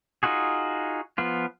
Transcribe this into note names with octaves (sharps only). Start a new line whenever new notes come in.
D#4 F4 F#4 G#4
F3 B3 F4